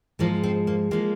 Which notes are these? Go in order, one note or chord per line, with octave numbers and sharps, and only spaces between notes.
G#2 F3 G#3 A#3
C4
A#3
F3 G#3 A#3